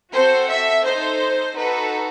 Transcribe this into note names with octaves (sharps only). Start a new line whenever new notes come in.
C4 F#4 A4 C5
E5
D#4 A4 C5
D#4 F#4 A4 B4